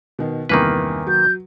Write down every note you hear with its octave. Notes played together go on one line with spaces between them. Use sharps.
B2 D#3
E2 G2 C3 D#3 A#3 B4
F#3 G6